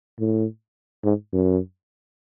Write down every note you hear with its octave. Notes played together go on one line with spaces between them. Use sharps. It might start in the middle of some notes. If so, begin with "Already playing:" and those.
A2
G#2
F#2